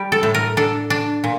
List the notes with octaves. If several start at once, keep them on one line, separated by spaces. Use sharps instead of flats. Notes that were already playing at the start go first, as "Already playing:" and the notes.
Already playing: G3 G4
A4
A2
A#4
D4 A4
D4
A#2